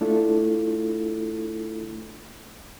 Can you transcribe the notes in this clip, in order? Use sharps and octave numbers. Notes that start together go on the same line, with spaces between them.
A3 D4 E4 F4 A4